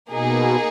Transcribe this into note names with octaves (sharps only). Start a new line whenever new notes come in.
B2 A#3 D#4 G#4